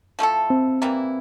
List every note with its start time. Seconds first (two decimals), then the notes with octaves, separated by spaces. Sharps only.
0.19 F3 A3 E4 A4
0.50 C4
0.82 E3 G3 A#3 E4